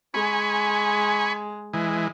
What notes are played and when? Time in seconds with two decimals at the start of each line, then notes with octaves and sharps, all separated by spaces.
0.14 G#3 G#5 B5 C#6
1.74 E3 G#3